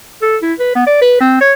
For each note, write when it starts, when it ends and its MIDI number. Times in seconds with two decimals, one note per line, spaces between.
0.22 0.37 69
0.42 0.53 64
0.59 0.72 71
0.75 0.87 59
0.87 1.01 74
1.02 1.17 71
1.20 1.38 60
1.41 1.53 73